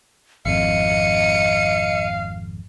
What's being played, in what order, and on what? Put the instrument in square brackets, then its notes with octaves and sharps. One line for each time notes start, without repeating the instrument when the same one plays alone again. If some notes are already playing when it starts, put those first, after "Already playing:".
[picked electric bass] G#1 F2 [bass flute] D#5 [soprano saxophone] F5 [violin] C#7 D#7